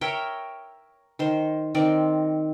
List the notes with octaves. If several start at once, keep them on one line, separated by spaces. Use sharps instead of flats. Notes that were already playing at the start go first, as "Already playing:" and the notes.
A#4 C#5 E5 G5
D#3 C5
D#3 C4 D5